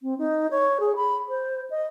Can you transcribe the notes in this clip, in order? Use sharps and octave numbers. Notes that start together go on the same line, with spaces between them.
C4
D#4
C#5
G#4
B5
C5
D#5